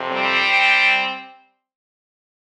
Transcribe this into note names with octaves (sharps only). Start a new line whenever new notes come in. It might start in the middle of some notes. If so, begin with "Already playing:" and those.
Already playing: F2 C3
G3 C4